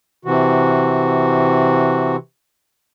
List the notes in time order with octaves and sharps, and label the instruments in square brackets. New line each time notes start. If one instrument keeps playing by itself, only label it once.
[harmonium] C3 E3 F#4